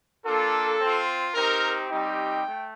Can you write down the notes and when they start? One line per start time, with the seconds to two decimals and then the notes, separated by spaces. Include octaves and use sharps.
0.23 A#3 D4 F4 A4
0.78 C4 F4
1.33 C4 D#4 G4 A#4
1.89 G3 C4 D#4 G4 G5
2.44 A3